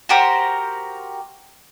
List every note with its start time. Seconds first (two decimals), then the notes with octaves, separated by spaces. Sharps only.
0.09 F#4 G4 A#4 C5